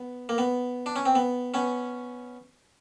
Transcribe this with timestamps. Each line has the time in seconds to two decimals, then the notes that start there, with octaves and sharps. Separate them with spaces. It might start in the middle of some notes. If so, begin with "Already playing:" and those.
Already playing: B3
0.29 A#3
0.38 B3
0.86 D4
0.96 C#4
1.06 C4
1.15 B3
1.54 B3 C#4